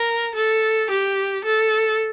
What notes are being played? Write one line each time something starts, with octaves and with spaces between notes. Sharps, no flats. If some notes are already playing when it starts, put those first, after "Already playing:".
Already playing: A#4
A4
G4
A4